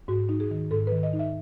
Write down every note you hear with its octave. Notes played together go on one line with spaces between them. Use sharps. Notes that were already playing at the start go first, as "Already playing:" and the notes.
G#2 F#4
D#4
G#4
D#3
G#2 A4
B4
D#3
D#5
D#4
E5